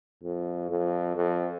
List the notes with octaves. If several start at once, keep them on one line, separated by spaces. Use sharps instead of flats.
F2
F2
F2